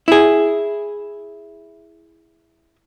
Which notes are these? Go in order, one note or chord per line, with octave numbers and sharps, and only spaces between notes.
E4 G#4